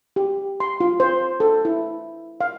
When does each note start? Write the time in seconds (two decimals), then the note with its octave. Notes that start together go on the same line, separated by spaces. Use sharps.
0.16 G4
0.60 C6
0.80 F4
1.00 C5
1.40 A4
1.65 E4
2.41 F5